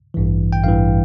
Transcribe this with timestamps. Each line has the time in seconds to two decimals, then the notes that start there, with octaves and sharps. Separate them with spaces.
0.14 A1 G2 E3
0.53 G5
0.64 A1 G2 E3 F5